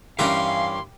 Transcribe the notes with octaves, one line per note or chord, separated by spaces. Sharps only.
G2 E3 C#4 G4 A#4 F5 C6